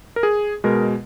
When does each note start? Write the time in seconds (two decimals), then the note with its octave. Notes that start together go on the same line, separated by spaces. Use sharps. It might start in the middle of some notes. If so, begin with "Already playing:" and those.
0.16 A#4
0.23 G#4
0.64 B2 G#3 A#4